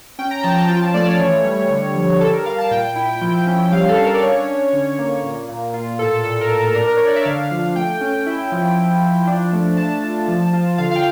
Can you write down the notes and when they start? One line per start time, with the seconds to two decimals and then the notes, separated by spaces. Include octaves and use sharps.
0.19 C#4 G5
0.31 A#5
0.39 G5
0.43 F3 A5
0.56 A5
0.69 F4 G5
0.82 A5
0.94 A3 D5
1.07 C#5
1.19 E3
1.44 G3
1.70 D3
1.95 F3
2.21 G3 A4
2.33 A#4
2.46 G3 F5
2.58 A5
2.71 A#2 G5
2.96 E4
3.21 F3
3.47 C#4
3.72 G3 F5
3.89 A4
3.98 D4
4.06 A#4
4.14 D5
4.22 C#4 C#5
4.48 C#4
4.73 D3
4.99 A#3
5.23 A#2
5.48 A#2
5.74 F4
5.99 A2 A4
6.25 A#2 A4
6.41 A#4
6.50 A#2
6.58 A4
6.74 D4 A#4
6.87 A#4
6.97 D4 C#5
7.07 D5
7.16 E5
7.25 D3 F5
7.51 F3
7.75 A3 G5
8.01 C#4
8.26 E4
8.52 F3
8.77 F3
9.02 F3
9.27 D4
9.53 A3
9.77 D4 A5
10.03 F4
10.28 F3
10.53 F4
10.78 D3 F5
10.91 F5
10.96 G5